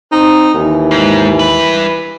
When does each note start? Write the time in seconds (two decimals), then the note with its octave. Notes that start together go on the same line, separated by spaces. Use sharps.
0.12 C4 D#4
0.54 D#2 E3
0.91 G#2
1.39 G3 B4